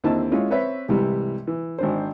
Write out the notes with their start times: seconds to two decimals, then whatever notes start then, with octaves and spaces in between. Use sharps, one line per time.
0.04 D#2 D3 C4 E4 D#5 A5
0.32 G#3 C#4 E4 F4
0.50 C4 B4 C#5 E5
0.88 C2 G#2 C3 E3 G3
1.47 E3
1.79 G#1 D4 C5